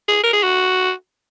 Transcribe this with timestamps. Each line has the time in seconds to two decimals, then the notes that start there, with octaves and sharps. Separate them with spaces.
0.08 G#4
0.24 A#4
0.33 G#4
0.43 F#4